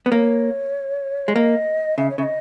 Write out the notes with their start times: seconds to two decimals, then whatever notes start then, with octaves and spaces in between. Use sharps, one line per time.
0.06 B3
0.11 A#3 C#5
1.28 G#3
1.36 A#3 D#5
1.98 C#3 E5
2.10 C#5
2.18 C#3 E5
2.23 D#5